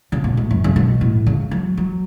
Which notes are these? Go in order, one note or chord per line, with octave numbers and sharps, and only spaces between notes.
C#3
B2
A2
F#2
C#3
B2
A2
C#3
F#3
F#3